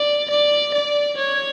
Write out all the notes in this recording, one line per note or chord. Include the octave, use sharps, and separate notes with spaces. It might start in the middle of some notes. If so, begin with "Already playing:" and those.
Already playing: D5
D5
D5
C#5